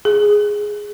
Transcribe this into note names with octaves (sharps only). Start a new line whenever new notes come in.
G#4